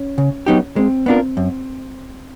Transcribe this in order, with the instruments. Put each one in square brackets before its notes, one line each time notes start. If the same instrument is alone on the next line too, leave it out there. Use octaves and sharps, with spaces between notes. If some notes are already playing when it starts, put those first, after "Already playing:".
Already playing: [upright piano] C#4
[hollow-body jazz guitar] C#3
F#3 B3 D#4 G4
[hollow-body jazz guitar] G#3 [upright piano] C4
[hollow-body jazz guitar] B3 D4 F4 A#4
F#2